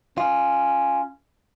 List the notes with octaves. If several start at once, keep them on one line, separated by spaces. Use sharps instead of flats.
C#4 F4